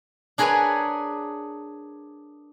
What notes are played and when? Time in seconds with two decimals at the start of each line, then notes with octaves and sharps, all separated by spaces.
0.38 D4 G#4 A#4 B4 C#5 G#5